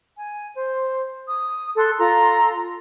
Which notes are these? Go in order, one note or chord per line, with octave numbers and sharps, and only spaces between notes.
G#5
C5
D#6
A4 C6 F#6
F4 A4 A#5 C6